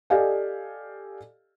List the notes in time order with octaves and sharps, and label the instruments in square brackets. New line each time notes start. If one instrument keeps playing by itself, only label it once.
[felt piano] G4 A4 D5 D#5 F5 G#5